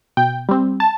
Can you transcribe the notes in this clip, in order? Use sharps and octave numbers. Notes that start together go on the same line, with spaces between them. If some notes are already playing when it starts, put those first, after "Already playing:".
B2 G5
G3 C4
A5